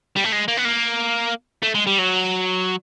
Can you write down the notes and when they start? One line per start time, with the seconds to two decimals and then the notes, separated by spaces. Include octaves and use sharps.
0.16 G3
0.24 A3
0.33 G#3
0.48 A#3
0.57 B3
0.65 A#3
1.63 A3
1.75 G#3
1.87 G3
1.98 F#3